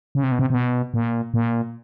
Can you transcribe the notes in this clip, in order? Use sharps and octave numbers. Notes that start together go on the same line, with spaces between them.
C#3
C3
B2
C3
C3
B2
A#2
A#2